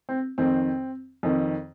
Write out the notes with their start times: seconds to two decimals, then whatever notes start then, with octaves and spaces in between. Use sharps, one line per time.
0.09 C4
0.38 F2 D#3 C4
1.23 F2 D#3